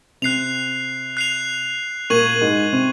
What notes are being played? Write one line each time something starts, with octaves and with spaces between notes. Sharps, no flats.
C3 C4 F#6 C7 F7
F#6 C7 F7
A#2 A#3 C#6 G#6 D#7 F#7
A#3
G#2 G#3
C3 C4